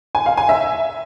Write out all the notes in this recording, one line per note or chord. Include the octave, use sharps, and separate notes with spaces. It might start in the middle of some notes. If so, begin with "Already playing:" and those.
G#5
F5
G#5
E5